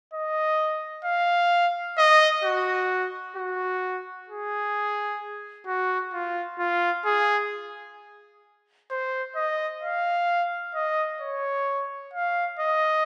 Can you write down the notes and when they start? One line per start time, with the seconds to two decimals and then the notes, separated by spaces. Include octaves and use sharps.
0.14 D#5
1.05 F5
1.98 D#5
2.44 F#4
3.36 F#4
4.29 G#4
5.66 F#4
6.13 F4
6.59 F4
7.05 G#4
8.91 C5
9.36 D#5
9.82 F5
10.75 D#5
11.21 C#5
12.14 F5
12.59 D#5